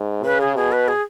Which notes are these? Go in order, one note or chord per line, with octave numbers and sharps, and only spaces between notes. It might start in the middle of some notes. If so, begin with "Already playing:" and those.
Already playing: G#2
C#3 B4
G#4
B2 G#4
B4
G#4